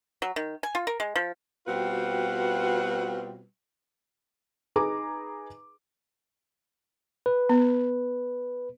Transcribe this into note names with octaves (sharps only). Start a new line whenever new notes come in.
F#3
D#3
G#5
F4
A#4
G#3
F3
B2 G3 C4 F4 F#4 B4
D#4 G#4 B4 A#5 D6
B4
B3